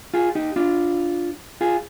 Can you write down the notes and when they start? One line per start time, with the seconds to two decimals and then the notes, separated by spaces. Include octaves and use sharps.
0.14 F4 G#4
0.35 D#4 G4
0.56 D4 F4
1.61 F4 G#4